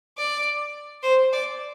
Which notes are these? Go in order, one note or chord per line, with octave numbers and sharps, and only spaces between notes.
D5
C5
D5